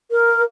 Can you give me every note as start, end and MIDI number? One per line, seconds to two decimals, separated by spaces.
0.11 0.41 70